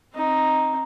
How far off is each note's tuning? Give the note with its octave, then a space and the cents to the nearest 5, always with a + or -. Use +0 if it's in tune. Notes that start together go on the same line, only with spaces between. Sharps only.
C4 +25 D#4 +0